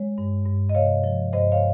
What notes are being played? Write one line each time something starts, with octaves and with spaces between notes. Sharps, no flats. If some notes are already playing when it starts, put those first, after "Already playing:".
Already playing: G#3 C#5
G2
G2
D#5
C3 C#5 F5
F3
G2 C5 D#5
C#5 F5